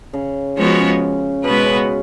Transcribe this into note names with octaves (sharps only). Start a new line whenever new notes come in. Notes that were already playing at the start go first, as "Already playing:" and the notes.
C#3
C#3 F3 G#3 B3 F#4 C#5
C#3
B2 G#3 B3 F#4 B4
C#3